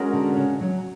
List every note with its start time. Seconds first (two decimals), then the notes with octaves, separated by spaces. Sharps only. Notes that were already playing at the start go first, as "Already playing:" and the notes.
Already playing: G#3 C#4 F#4 A#4 C#5
0.13 D3
0.37 C#3
0.61 F#3